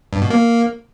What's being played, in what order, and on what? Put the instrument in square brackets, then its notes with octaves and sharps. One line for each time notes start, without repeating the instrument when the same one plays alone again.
[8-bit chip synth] G2
B2
A#3